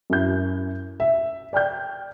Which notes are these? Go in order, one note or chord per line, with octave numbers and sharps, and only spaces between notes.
F#2 E4 G6
E5
D5 G5 F6 G6